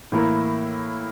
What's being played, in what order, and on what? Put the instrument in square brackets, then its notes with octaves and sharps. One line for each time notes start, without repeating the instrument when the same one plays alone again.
[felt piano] A2 E3 A#3 E4 A#4